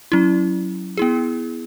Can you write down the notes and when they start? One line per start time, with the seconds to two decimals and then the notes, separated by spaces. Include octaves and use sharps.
0.12 F#3 C#4 E4
0.97 B3 E4 G#4